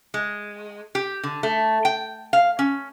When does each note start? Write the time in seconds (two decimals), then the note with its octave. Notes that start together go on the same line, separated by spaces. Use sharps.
0.14 G#3
0.95 G4
1.23 D3
1.43 A3
1.85 G5
2.33 F5
2.59 C#4